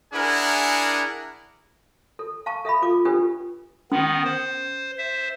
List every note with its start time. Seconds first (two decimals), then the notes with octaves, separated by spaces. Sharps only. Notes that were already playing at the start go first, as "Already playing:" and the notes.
0.13 D4 E4 G#4 A#4 F#5 G#5
2.19 A4
2.46 F5 A5 C#6
2.65 A4 E5 F5 B5
2.82 F4 A4 D6
3.05 C#4 D4 F4 G4 A4 B4
3.92 D#3 B3 C#4
4.25 C5
4.98 C5 E5